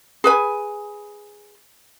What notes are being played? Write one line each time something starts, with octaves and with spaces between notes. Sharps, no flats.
G#4 B4 G#5